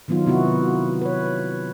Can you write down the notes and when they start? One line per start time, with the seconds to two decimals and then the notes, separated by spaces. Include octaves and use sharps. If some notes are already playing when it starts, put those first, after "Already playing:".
0.08 D#3 F#3 B3 D#4 F4
0.26 C3 B3 E4 F#4
1.01 B4 C#5